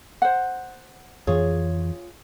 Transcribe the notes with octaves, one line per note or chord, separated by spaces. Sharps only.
C5 F#5
F2 E3 F4 G#4 C#5